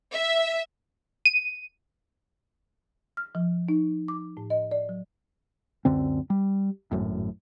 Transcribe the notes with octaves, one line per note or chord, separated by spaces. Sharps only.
E5
D#7
F6
F3
D#4
D6
A2
D#5
D5
F#3
C#2 F#2 D3 C4
G3
G#1 F#2 A2